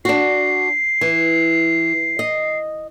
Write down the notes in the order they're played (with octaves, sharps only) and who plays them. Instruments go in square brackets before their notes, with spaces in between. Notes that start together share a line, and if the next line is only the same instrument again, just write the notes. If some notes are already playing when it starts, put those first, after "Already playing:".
[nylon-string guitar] D4 F#4 [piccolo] C7
[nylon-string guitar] E3
D#5